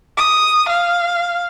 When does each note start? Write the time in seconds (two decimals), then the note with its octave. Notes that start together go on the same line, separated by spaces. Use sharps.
0.17 D#6
0.69 F5